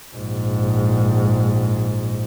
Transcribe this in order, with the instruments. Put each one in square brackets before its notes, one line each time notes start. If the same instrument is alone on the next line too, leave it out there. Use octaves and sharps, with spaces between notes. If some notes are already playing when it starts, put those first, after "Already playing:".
[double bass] A#1 G#2